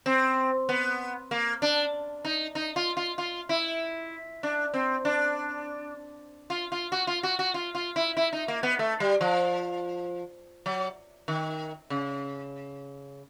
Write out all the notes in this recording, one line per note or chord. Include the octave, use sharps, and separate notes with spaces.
C4
B3
A#3
D4
D#4
D#4
F4
F4
F4
E4
D4
C4
D4
F4
F4
F#4
F4
F#4
F#4
F4
F4
E4
E4
D#4
A#3
B3
A3
G3
F3
F#3
D#3
C#3